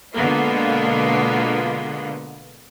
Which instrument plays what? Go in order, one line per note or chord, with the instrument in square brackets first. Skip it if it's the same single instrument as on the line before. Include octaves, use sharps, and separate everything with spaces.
[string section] B2 D3 G#3 A#3 B3 F4